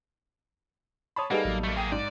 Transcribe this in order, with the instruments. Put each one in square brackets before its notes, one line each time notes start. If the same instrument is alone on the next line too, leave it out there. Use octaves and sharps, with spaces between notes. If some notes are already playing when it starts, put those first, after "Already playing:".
[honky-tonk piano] C#5 A5 B5 [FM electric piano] C6 D#6
[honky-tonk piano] G3 D#4 A4 [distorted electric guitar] A#3 [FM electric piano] G#4 B4 F#5
[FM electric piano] A1 F#3
[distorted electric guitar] A3 A#3
[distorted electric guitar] A#3 G#4 [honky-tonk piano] G5 D#6 D#7
[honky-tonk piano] G#2 [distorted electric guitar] D5